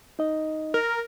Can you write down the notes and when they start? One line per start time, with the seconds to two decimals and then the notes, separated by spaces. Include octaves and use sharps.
0.19 D#4 D#5
0.74 A#4